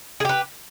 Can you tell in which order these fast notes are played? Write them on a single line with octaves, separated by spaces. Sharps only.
G#4 G4 B4